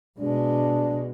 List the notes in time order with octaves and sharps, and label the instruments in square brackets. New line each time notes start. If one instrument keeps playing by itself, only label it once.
[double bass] B2 G#3 [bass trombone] D4